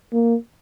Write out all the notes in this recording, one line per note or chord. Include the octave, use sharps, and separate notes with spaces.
A#3